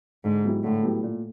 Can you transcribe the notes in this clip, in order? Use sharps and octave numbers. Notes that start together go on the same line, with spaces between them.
G#2 D3
F#3 B3 E4 G4
A2 D3
F#3 B3 E4 G4
A#2